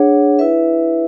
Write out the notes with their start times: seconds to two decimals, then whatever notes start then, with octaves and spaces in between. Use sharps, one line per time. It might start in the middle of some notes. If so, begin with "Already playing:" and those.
Already playing: D4 G#4 C#5 F#5
0.39 E4 B4 E5